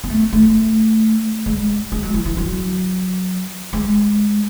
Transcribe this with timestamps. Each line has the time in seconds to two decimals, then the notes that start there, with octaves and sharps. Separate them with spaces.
0.04 B3
0.10 A3
0.33 A3
1.46 G#3
1.92 G#3
2.03 F#3
2.14 E3
2.25 E3
2.37 F#3
3.73 G#3